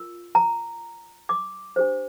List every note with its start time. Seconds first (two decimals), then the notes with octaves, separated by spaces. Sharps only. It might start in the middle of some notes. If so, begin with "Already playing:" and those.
Already playing: F4 A#4
0.35 A#5
1.29 D6
1.76 D4 G4 C5